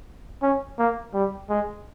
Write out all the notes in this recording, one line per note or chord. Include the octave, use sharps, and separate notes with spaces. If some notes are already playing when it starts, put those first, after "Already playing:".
C#4
A#3
G3
G#3